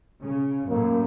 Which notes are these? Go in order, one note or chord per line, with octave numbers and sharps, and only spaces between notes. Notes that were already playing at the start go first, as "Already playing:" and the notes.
C#3
F#2 A2 A#3